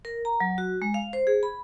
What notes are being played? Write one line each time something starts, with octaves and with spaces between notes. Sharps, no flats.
A#4
A#5
F#3
F#4
G#3
F5
C5
G#4
B5